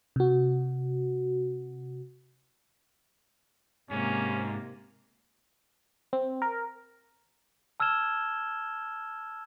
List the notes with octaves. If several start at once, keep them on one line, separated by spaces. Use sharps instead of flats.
C3 F#4
G#2 C3 A#3 C#4
C4
A#4
A5 E6 F6 G#6 E7 G7